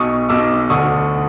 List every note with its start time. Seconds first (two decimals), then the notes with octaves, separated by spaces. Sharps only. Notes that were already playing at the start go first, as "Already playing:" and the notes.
Already playing: B1 B2 C#6 D#6
0.29 B1 B2 D6 E6
0.70 D2 D3 C#6 D#6